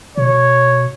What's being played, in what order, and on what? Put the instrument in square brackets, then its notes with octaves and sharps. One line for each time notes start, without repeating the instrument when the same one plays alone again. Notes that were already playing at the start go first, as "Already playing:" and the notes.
[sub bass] B2 [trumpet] C#5